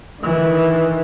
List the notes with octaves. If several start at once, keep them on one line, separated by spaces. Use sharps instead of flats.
D#3 E3